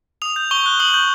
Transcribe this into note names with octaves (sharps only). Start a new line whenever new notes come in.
D#6 F7
G6
C#6 G7
F#6
D#6 F#7
G6